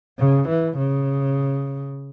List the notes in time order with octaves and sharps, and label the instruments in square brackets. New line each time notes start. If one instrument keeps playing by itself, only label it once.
[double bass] C#3
E3
C#3